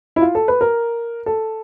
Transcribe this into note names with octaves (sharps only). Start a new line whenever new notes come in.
E4
F4
A4
B4
A#4
A4